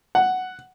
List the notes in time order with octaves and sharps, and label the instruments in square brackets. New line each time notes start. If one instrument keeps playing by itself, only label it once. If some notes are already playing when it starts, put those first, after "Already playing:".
[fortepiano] F#5